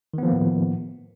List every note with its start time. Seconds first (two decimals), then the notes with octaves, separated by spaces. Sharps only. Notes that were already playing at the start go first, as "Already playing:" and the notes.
0.14 D#3
0.18 B3
0.23 F3
0.28 A#3
0.32 A2